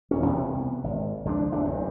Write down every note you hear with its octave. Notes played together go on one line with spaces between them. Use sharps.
E1 D#2 C#4
C2 C3 E3 B3
G#1
C#2 F3 F#3 D4
G1 E2 A3 D4
F#1 E2 G2